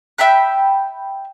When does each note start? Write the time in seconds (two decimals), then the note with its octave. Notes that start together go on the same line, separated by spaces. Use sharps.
0.18 E5 G5 B5 F#6